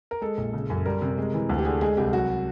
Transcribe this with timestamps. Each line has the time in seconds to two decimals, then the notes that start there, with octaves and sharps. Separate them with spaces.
0.11 A#4
0.21 G#3 A4
0.38 A#1
0.53 C#3
0.70 F#2
0.85 G3 A#4
1.02 C3
1.18 G#3
1.34 E3
1.49 D2
1.58 G4
1.65 D3 G#4
1.81 G#3 G#4
1.97 C2 G4
2.13 F#3 F#4